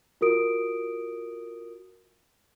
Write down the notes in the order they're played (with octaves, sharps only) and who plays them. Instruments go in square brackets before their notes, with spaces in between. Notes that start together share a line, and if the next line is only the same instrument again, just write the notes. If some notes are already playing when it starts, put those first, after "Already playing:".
[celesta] F4 F#4 A#4 D#6 D7